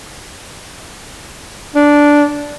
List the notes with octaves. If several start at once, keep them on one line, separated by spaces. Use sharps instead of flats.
D4